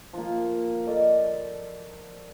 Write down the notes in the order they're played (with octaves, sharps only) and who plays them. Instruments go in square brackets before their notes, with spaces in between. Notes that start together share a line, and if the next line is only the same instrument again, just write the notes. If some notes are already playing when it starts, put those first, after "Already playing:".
[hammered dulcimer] F3 A#3
A4 A#4 D5 D#5